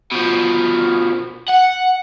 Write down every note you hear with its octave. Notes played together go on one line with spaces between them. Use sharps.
B2 F3
F#5